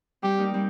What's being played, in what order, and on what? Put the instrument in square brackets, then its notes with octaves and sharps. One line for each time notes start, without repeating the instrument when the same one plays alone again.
[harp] G3 C4 [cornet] G4
[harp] A#3 D#4
G3 C4